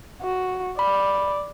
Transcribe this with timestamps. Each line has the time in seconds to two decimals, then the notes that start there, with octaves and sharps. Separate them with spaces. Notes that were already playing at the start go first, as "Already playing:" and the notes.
0.22 F#4
0.79 D5 B5